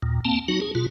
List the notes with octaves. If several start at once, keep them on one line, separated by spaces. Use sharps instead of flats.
D#2 A#2
A#3 C4 A5
F#3 D#4 F#4
G#4
B2 F4